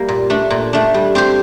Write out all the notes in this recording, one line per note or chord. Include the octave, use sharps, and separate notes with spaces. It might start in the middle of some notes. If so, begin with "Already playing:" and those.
Already playing: G3 A#3
A#2
A3 D4
A#2
A3 D4
G3
C4 G4 C5